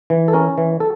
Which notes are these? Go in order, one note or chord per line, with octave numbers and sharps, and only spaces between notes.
E3
A4
C#4 A#4
E3
A4